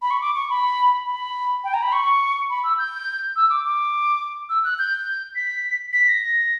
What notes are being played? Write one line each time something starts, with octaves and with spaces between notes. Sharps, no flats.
B5
C#6
D6
C#6
B5
B5
G5
A#5
B5
C#6
B5
E6
G6
E6
D6
D6
E6
F#6
G6
B6
B6
A#6